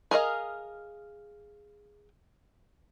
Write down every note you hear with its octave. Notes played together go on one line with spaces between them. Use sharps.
G#4 A#4 D#5 F5